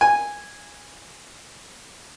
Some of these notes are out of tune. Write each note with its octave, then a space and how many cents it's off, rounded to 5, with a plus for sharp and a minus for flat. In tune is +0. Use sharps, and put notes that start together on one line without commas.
G#5 -10